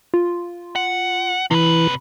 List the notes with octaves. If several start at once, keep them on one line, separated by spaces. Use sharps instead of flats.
F4
F#5
C3 E3 B4